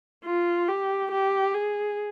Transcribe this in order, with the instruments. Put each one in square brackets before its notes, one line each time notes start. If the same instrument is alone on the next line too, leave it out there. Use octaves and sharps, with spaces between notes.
[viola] F4
G4
G4
G#4